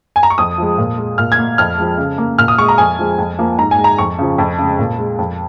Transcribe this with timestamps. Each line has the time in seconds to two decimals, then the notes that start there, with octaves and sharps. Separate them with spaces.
0.16 G#5
0.23 A#5
0.30 C#6
0.38 F2 D#6
0.58 F3 G#3
0.78 A#2
0.98 G#3
1.18 A#2 F6
1.32 G#6
1.38 A#3
1.58 F2 F6
1.78 F3 G#3
1.98 C#3
2.18 A#3
2.38 A#2 F6
2.48 D#6
2.58 G#3 C#6
2.69 A#5
2.78 F2 G#5
2.99 F3 G#3
3.18 F2
3.39 F3 A#3
3.58 G#2 A#5
3.71 G#5
3.78 G#3
3.84 A#5
3.98 F2 C#6
4.19 C#3 F3
4.38 F2
4.59 C#3 G#3
4.79 A#2
4.99 G#3
5.19 F2